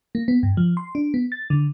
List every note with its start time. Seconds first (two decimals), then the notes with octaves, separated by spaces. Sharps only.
0.15 A#3
0.28 B3
0.43 G2
0.57 F3
0.77 C6
0.95 D4
1.14 B3
1.32 A6
1.50 D3